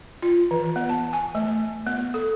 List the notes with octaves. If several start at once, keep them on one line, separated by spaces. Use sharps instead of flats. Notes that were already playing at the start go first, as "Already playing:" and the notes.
F4
E3
B3
A5
G#5
A3
B3
A4